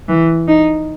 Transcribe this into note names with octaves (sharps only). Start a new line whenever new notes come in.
E3
D#4